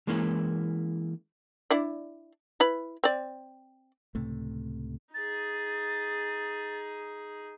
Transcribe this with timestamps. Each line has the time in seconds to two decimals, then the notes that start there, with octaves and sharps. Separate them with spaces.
0.07 E3 G#3 A#3 C#4 E4
1.70 D4 E4 D5
2.60 E4 B4 B5
3.04 C4 D5
4.15 C#2 A2 C3 A3
5.14 D#4 G#4 A6